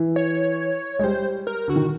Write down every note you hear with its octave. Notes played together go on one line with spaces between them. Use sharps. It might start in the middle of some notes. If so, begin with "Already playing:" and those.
Already playing: E3
C#5
G#3
G3 C5
A#4
D3 F#4
D#3